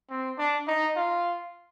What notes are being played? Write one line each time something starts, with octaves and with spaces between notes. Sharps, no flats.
C4
D4
D#4
F4